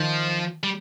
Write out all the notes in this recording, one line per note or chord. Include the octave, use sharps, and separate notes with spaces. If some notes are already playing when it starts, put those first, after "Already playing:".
Already playing: D#3 F3
G3